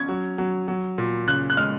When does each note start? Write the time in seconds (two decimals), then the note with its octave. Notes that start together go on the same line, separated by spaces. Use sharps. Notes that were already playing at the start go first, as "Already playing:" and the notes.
Already playing: C#4 G#6
0.09 F#3
0.38 F#3
0.68 F#3
0.98 A#2
1.27 C#3 F#6
1.50 F#6
1.57 G#3 F6